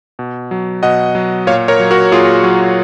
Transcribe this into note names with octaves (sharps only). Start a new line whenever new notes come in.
B2
F#3
B2 D#5 F#5
F#3
A#2 C#5 F5
A#4 C#5
F#3
F#4 A#4
A#2 F4 G#4
F#3